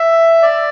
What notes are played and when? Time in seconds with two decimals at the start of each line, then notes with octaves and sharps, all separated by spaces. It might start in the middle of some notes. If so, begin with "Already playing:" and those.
Already playing: E5
0.42 D5